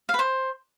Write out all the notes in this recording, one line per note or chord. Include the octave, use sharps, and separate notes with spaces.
F5
B4
C5